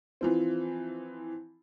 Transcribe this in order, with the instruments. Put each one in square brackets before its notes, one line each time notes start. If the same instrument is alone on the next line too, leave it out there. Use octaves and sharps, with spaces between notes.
[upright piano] E3 F3 C4